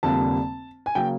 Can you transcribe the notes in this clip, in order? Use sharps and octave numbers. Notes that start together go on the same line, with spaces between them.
F1 F2 D3 G3 A#3 A5
G#5
C#3 F#3 A#3 G5